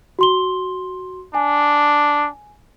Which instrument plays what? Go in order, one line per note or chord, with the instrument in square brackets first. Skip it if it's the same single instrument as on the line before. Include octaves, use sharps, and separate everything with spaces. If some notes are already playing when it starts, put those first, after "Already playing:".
[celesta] F#4 C6 G7
[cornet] D4 [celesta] G#5